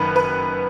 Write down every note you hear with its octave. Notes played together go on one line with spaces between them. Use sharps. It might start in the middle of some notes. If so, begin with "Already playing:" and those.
Already playing: F#1 F#2 D#3 B4
B4